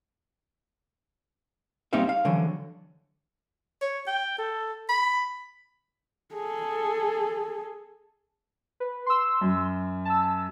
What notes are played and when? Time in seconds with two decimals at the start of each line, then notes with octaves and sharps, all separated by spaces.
1.93 G3 A#3 C4 D#4 E5 F5
2.09 F5
2.25 D3 E3 F#3
3.81 C#5
4.07 G5
4.38 A4
4.89 B5
6.35 G#4 A4
8.80 B4
9.06 C6 E6
9.41 F#2
10.05 A5 E6